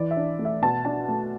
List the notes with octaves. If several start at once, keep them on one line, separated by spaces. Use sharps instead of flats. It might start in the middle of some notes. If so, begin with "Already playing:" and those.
Already playing: E3 D5
E5
D4
A3
E5
B2 A5
D4 A5
A3